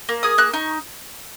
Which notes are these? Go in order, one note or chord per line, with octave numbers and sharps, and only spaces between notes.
A#3
G#4 D#6
A#3 F#6
D#4 C#6